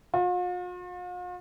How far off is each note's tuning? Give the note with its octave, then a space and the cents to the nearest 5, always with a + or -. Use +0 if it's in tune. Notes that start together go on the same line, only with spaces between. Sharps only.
F4 +45